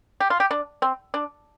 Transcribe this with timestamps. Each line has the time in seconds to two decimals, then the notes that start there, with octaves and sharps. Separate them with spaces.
0.20 G4
0.30 F4
0.40 G4
0.51 D4
0.82 C4
1.14 D4